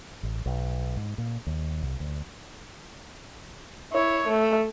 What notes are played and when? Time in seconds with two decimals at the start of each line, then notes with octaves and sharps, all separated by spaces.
0.23 A1
0.46 B1
0.96 G#2
1.18 A#2
1.47 D#2
1.82 C2
2.00 D2
3.92 E4 C#5
4.28 A3